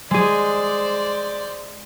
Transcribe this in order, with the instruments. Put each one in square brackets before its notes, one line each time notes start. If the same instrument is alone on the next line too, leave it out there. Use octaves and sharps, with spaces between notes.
[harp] G#3 G#4 [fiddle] C5 D5